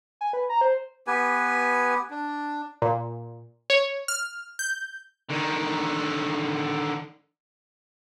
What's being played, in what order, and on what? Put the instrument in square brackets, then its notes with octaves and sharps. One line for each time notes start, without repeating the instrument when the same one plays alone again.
[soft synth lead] G#5
B4
A#5
C5
[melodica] B3 G4 B4 G#5
D4
[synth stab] A#2
C#5
F6
G6
[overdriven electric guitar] D3 D#3